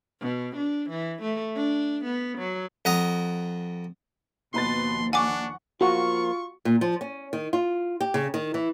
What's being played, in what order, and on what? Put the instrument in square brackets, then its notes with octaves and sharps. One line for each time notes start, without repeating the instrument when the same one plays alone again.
[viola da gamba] B2
D4
E3
A3
D4
B3
F#3
[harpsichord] F2 F#5 A#5 D#6
[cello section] D#2 F3 [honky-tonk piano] B2 B4 A6 [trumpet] C6
[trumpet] D4 [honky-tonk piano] F#5 C#6 [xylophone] G#5 D6
[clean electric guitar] F3 A#3 [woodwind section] F4 [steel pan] F#4 [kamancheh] C#6
[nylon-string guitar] A#2
F3
C#4
D#3
F4
G4
C#3
D#3
E3